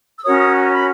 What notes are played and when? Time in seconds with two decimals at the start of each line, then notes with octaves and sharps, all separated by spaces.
0.19 E6
0.24 C#4 F#4 A#4 C#5 D#6
0.40 D#6
0.56 G#5
0.72 B5